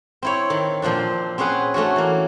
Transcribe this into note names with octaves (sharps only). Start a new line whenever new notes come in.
C4 E4 C#5
D#3
A#2 F3 C4 D4
C4 C#4 G#4 B4 F#5
A3 C#4 D4 F#4
E3 A#3